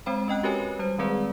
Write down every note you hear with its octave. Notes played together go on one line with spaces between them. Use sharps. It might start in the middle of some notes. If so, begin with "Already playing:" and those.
G#3 C4 C5 G5 B5
C#4 D#5 G5 F#6
F#4 G4 A#4 B4 C#5 G#5
G3 C5
D#3 G#3 C4 G#4 B4 D5